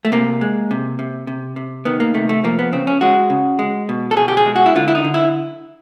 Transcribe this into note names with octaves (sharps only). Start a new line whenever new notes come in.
A3
C3 A#3
G#3
C3
C3
C3
C3
D#3 B3
A#3
C3 A3
A3
F3 A#3
B3
C#3 C4
C#4
G#3 F#4
C#3
G#3
B2
A4
B2 G#4
G4
G#4
G#3
F#4
E4
D3 F4
E4
D#4
D3
E4